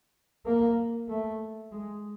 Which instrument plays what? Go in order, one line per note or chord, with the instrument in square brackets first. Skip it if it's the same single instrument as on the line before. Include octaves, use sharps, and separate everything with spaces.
[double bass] A#3
A3
G#3